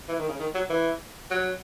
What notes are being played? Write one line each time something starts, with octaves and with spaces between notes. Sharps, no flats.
E3
D#3
C#3
D#3
F#3
E3
F#3